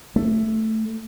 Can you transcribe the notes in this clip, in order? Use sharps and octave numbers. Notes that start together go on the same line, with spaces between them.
A3